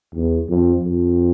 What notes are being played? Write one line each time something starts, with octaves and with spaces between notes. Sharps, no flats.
E2
F2
F2